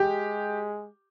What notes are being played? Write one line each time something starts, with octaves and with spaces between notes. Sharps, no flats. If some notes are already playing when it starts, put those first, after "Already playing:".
Already playing: G#3 G4